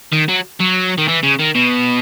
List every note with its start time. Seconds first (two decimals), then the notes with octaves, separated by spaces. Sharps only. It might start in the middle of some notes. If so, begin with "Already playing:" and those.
0.12 D#3
0.29 F#3
0.60 F#3
0.98 D#3
1.08 E3
1.23 C#3
1.39 D#3
1.55 B2